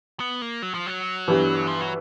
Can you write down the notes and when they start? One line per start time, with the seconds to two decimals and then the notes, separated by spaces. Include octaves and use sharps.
0.20 B3
0.42 A#3
0.62 F#3
0.74 F3
0.86 F#3
1.27 G2 E3 G3 B3
1.67 F3
1.80 F#3